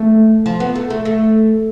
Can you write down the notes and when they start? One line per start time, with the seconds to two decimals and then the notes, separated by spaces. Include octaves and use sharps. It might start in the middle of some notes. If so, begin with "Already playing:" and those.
Already playing: A3
0.46 F3
0.60 B3
0.75 A3
0.90 A3
1.05 A3